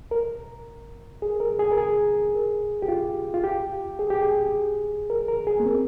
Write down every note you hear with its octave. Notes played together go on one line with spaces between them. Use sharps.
A#4
G#4
A#4
G#4
A#4
G#4
G4
F4
F4
G4
G#4
G4
G#4
A#4
A#4
G#4
A#3
C4